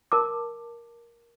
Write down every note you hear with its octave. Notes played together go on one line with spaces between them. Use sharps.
A#4 A5 D6